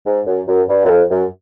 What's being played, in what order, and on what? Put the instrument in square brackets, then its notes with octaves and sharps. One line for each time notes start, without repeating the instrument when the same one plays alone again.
[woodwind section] G#2
F#2
F#2
G2
F#2
F2
F#2